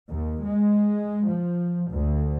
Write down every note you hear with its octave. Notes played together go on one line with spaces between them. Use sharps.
D#2
G#3
F3
D2